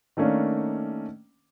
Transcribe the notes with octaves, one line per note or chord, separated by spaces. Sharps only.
D#3 A3 A#3 C#4 D4